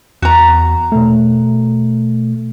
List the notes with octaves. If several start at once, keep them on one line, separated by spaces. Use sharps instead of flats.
E2 F#4 A#5
B2 A3